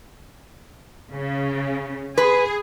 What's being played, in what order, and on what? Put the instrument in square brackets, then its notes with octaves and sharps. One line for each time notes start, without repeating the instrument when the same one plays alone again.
[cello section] C#3
[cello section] G#4 [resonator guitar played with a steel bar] B4